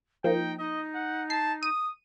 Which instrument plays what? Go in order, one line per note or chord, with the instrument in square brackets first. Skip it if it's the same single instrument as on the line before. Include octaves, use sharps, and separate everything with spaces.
[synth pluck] F3 A#3 [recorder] D#4 [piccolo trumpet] G5
[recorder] D#4 [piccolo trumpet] D#5
[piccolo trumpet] F#5
[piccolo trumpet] A5 [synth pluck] C7
[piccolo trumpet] D#6 [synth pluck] D#7